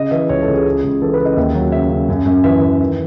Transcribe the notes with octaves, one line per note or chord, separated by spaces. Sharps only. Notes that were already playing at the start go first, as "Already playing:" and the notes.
Already playing: C#3 D#5
E3 E5
C#2 C#5
A4
C#2
G#4
C#3
C#2
E3 A4
B4
C#3
D#5
D#2 E5
F#3
C#3 E5
C#3
F#2
F#2
E3 E5
E3
D#3